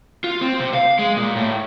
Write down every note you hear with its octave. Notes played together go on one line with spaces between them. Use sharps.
F4
C4
C3
F5
G#3
A#2
A2